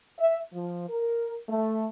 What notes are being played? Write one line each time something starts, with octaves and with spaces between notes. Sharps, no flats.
E5
F3
A#4
A3